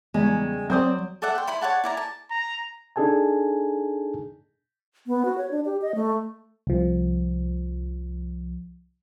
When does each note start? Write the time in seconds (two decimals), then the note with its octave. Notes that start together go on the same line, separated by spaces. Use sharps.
0.14 E2 C#3 G3 G#3
0.70 F#3 C4 C5 D5 D#6 G6
1.22 A4 D5 E5 F#5
1.35 G5 C6
1.47 E4 B5 C6
1.61 C#5 D5 F#5 A5
1.84 E4 D5 A#5
1.97 A5
2.31 A#5
2.96 D4 D#4 G#4 A4 G#5 A5
5.07 B3
5.25 F#4
5.38 C#5
5.51 D4
5.66 G4
5.82 D#5
5.95 A3
6.67 C2 F3